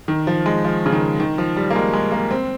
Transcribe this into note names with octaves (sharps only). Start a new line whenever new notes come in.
D#3
F3
G#3
F3
C#3
D#3
D#3
F3
G3
A#3
G#3
G#3
A#3
C4